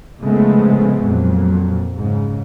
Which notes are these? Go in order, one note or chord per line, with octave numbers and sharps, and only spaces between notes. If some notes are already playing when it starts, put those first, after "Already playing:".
A2 C#3 F3 G#3 A3 B3
F2 A#2 F#3
G#2 C#3